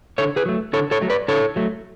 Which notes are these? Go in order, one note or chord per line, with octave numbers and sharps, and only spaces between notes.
D3 A4 C#5
G#4 B4
F#3 A3
D3 A4 C#5
A4 C#5
F#3 A3
B4 D5
D3 A4 C#5
F#3 A3